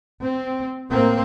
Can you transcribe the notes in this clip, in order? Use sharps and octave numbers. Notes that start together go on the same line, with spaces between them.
C4
A2 A#3 C4